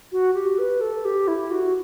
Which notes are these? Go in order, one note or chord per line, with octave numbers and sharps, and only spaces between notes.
F#4
G4
B4
A4
G4
E4
F#4